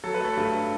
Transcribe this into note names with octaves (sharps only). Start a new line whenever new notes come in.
F#3 A4
B4
A3 A4
G2